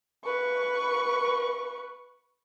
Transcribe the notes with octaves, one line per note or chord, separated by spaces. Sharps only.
B4 C#6